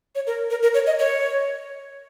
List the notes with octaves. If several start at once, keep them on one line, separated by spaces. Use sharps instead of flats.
C#5
A#4
A#4
A#4
C#5
D#5
C#5